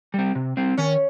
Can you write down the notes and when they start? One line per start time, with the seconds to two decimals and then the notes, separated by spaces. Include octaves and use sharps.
0.14 G3 C4
0.35 C3
0.57 G3 C4
0.78 D#3 C#4